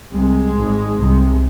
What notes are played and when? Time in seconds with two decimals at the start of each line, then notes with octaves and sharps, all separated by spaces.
0.11 C2 C3 G#3
0.53 G#1 G#2
0.96 C2 C3